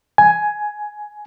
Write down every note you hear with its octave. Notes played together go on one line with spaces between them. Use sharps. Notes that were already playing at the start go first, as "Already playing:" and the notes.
G#5